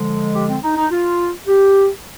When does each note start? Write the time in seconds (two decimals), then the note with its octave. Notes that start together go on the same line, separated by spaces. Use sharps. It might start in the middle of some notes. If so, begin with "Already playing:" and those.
Already playing: D3 F3 G#3
0.34 G4
0.48 C4
0.63 D#4
0.77 D#4
0.91 F4
1.48 G4